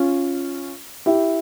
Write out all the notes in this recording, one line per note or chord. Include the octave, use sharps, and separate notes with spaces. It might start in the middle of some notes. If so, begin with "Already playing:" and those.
Already playing: C#4 F4
E4 G4